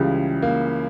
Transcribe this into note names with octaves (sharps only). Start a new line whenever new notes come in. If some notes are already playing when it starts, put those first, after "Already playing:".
Already playing: C#2 C#3 E3 G3
A#3